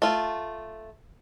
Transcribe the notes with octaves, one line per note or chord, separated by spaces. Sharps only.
A3 F4